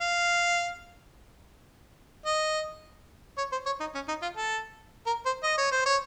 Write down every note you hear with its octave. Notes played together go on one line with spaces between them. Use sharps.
F5
D#5
C#5
C5
C#5
D#4
C#4
D#4
F4
A4
A#4
C5
D#5
C#5
C5
C#5